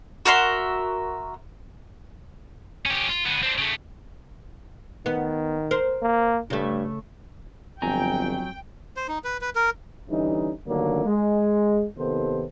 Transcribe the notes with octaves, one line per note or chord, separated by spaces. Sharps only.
F#4 A#4 E5 C6
C#4 G4
F4
D3 B3
C4 D4
C#3 A3
D#3 B3
A#4 C5
A#3
G2 C#3 A3
G1 F2 F#3 G5 G#5 A#5
C5
D#4
B4
B4
A#4
D3 E3 G3 C#4 D#4
G2 D3 D#3 F#3 A3 A#3
G#3
D#2 C3 D#3 B3 A4 C5